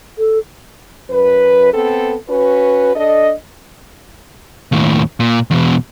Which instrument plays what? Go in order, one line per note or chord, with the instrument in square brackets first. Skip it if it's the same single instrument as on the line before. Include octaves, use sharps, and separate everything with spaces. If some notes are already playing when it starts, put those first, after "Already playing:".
[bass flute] A4
[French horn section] F#2 B4
B3 C4 A4
C#4 F#4 B4
D4 A4 D#5
[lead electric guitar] D#2 A2
A#2
E2 B2